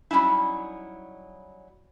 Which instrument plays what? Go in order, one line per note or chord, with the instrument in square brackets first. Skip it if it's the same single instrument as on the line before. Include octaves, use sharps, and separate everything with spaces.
[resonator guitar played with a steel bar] F#3 G3 C#4 D#4 E4